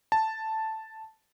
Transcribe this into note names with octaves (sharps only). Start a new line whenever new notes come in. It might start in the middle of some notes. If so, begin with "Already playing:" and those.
A5